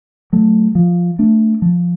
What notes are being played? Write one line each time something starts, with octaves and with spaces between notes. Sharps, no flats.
F#3 A3
F3
A3 D4
F3